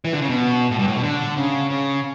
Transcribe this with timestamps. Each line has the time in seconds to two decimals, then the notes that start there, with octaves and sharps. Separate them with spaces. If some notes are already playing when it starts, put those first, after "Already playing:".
0.05 E3
0.13 D3
0.21 C#3
0.29 B2
0.71 A2
0.79 G2
0.87 A2
0.96 B2
1.03 D3
1.37 C#3
1.70 C#3